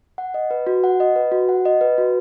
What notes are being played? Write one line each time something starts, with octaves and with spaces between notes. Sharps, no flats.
F#5
D#5
B4
F#4
F#5
D#5
B4
F#4
F#5
D#5
B4
F#4